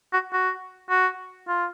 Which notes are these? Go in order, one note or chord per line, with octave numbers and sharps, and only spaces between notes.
F#4
F#4
F#4
F4